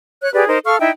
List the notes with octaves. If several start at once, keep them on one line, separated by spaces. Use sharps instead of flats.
C#5 F#6
G4 G#4 B4 D5
D#4 A#4 C5
A4 F5 C#6 F6
D#4 E4 E5 G5